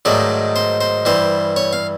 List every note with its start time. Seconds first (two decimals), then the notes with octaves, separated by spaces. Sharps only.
0.05 G#2 D#3 F#3 A3 D5
0.56 C5
0.81 C5
1.05 G2 E3 G3 C5
1.56 C#5
1.73 F5